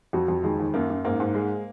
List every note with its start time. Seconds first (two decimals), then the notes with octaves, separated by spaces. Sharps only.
0.13 F2 F#4
0.28 F2
0.43 D#2 G#3
0.60 D#2
0.74 F#2 A#3
0.90 F#2
1.05 G#2 A#3
1.20 G#2
1.34 G#3